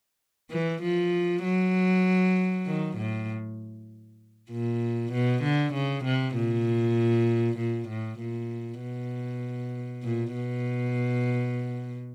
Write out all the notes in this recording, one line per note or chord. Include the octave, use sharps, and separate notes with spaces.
E3
F3
F#3
D#3
A2
A#2
B2
D3
C#3
C3
A#2
A#2
A2
A#2
B2
A#2
B2